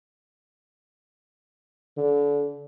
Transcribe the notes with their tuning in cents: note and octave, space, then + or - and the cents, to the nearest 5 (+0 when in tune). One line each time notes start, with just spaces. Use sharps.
D3 -30